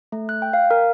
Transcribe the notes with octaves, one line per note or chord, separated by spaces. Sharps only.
A3
F#6
G5
F5
A#4